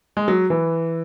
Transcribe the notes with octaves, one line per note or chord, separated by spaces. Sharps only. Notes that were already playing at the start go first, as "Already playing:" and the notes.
G#3
F#3
E3